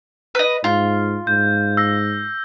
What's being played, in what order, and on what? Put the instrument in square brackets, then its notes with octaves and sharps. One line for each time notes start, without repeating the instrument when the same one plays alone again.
[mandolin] B4 D#5
[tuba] G#2 [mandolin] F4
[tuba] G#2 [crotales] G6
[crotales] E6 A#6